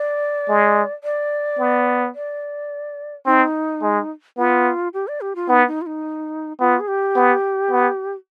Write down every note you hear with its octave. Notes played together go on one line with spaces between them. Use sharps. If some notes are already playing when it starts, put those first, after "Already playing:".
Already playing: D5
G#3
D5
B3
D5
C4 D#4
G#3
B3 F4
G4
D5
G4
F4
B3 D#4
D#4
F4
D#4
B3 F4
G#4
G4
B3
B3